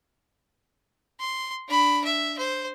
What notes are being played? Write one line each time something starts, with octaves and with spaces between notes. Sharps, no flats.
C6
D4 B5
E5
C5